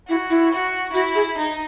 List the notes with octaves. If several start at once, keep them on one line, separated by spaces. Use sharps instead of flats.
E4 F#4
E4
F#4
E4 F#4
G#4
D#4